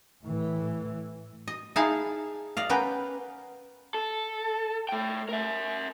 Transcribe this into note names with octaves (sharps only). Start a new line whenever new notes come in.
A2 E3
D#5
D#4 E4 G#4 F5 G#5 A5
D5 D#5 F5
B3 C#4 A#4 B4 G5
A4
A3 G5
A#4 E5